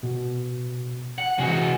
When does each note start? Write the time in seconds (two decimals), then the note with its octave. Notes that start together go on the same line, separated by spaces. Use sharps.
0.03 B2
1.18 F#5
1.38 C3 E3 G#3 F#4